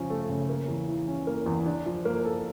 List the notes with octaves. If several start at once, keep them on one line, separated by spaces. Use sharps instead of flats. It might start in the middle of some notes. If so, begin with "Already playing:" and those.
Already playing: C#3 F3 C#4
A3
C#3
A#3
E2
E3
C#4
A#3
E2
D4
F3
A#3
A4